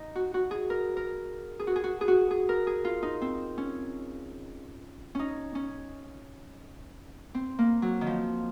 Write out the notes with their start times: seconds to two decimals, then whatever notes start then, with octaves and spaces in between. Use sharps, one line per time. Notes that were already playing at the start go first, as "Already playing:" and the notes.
Already playing: D#4
0.15 F#4
0.34 F#4
0.51 G#4
0.70 A#4
0.97 A#4
1.59 G#4
1.67 F#4
1.76 G#4
1.84 F#4
2.01 G#4
2.08 F#4
2.31 G#4
2.49 A#4
2.67 G#4
2.85 F4
3.03 D#4
3.22 C4
3.58 C#4
5.15 C#4 D#4
5.55 C#4
7.34 C4
7.59 A#3
7.82 F#3
8.01 D#3
8.07 F3